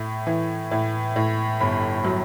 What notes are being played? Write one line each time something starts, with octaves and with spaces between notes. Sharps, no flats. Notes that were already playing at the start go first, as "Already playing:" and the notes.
Already playing: A2
E3
A2
A2
G1 B5
F#3